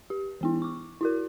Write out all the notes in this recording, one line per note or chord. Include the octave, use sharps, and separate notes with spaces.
G4
E3 B3 E4
C#6 D6
E4 F#4 A#4